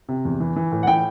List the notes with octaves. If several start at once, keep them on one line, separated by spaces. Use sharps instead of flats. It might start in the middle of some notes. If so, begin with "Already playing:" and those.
C3
E2
E3
E3
A2
F#5
E3 G5